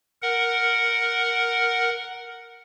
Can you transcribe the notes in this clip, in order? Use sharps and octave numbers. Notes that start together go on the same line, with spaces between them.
A#4 F#5